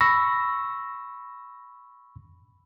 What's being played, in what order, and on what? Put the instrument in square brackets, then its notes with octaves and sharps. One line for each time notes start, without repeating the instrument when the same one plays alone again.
[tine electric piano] B5 C#6 E6 A#6